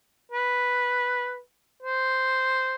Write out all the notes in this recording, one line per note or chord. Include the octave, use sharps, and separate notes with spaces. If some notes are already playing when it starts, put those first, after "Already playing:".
B4
C5